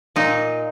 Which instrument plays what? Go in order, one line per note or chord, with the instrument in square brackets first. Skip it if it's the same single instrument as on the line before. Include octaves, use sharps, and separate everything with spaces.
[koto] A#2 D#4